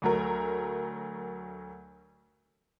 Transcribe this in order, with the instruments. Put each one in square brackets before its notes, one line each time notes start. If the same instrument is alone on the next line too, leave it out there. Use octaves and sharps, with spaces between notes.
[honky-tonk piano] D2 F#3 A3 A#4